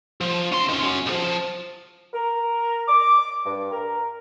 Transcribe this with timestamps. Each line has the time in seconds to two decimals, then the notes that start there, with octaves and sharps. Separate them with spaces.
0.21 F3
0.52 C#4 C6
0.69 D#3 C#4
0.83 C#4 F#4
1.06 C2 F3
2.14 A#4
2.88 D6
3.46 G2
3.72 A#4